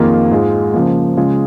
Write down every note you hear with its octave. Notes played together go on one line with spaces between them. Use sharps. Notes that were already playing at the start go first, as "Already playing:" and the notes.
Already playing: F2 D#3 A#3 F4 G#4
G#2 G#3 F4 G#4
C#3 F3 A#3
C#3 G#3 F4 G#4